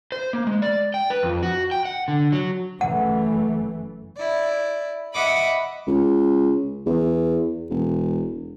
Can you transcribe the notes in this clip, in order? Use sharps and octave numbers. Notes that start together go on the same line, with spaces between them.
C5
A#3
G#3
D5
G5
B4
F2
F#4
G5
F#5
D3
F#3
F#1 E3 A3 F#5
E4 D5
D#5 E5 F#5 B5 D6 D#6
C#2
E2
E1